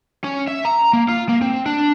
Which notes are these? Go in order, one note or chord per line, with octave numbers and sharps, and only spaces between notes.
C#4
E5
A#5
A#3
F4
A#3
C4
D4